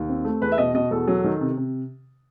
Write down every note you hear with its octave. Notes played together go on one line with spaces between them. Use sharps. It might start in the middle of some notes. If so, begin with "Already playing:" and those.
Already playing: D#2
C4
A3
E2 B4
E5
B2 D#5
B2 D#5
E2 A4
F#3
D#3
C3
C3